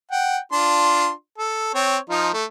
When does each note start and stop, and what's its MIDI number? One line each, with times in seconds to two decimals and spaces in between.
0.12 0.38 78
0.12 0.38 79
0.52 1.10 62
0.52 1.10 65
0.52 1.10 84
1.38 1.73 69
1.74 1.97 60
1.74 1.97 73
2.10 2.30 53
2.10 2.30 63
2.10 2.30 65
2.33 2.44 57